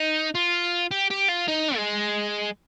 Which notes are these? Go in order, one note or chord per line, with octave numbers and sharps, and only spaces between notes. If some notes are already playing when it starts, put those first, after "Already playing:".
Already playing: D#4
F4
G4
G4
F4
D#4
G#3